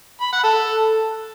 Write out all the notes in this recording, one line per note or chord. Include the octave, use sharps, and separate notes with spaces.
B5
F#5
A4